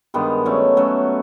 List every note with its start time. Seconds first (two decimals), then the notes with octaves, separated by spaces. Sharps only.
0.14 G2 D#3 G#3 B3
0.46 F#3 A3 C#4
0.77 F#3 A3 C#4